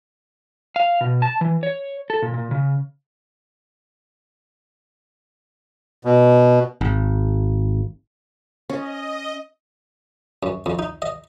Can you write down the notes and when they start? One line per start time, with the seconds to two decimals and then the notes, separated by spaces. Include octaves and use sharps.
0.76 F5
1.01 B2
1.22 A5
1.41 E3
1.63 C#5
2.10 A4
2.22 A#2
2.34 A#2
2.51 C#3
6.05 B2
6.81 G#1
8.70 C#4 D#5
10.43 F#2
10.66 F2
10.79 D#4
11.02 D#5